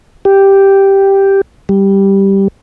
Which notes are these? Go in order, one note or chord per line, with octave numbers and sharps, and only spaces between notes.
G4
G3